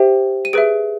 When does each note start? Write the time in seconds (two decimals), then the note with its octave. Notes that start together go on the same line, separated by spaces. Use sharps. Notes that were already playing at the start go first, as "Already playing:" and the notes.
Already playing: G4 C5 E5 G5
0.45 D#7
0.53 G#4 B4 E5 D7